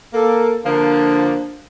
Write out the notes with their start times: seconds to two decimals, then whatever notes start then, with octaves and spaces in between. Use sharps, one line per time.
0.13 A#3 A4
0.65 D3 F3 A#3 D4